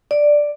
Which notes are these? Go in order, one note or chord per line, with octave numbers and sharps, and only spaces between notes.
D5